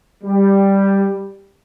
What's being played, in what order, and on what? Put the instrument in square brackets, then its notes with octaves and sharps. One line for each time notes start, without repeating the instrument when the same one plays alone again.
[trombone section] G3